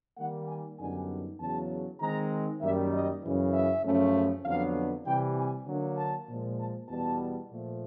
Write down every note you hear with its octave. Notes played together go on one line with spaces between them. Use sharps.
D#3 G3 A#3 F#5
G#5
F#2 D3 G3 B3 D#4 G#5
E2 C#3 F#3 A5
D#3 G#3 C4 D#4 A#5
F#2 D#3 G3 A#3 E5
D#5
F#2 C#3 E3
E5
F#2 C#3 F3 A3 C#4
F2 D3 F#3 B3 D4 F5
C3 E3 G3 G5
G#5
D3 F#3 A#3 D4
A5
A#2 F3 G#3
A5
E2 B2 G3 B3 A5
A#2 F3 A3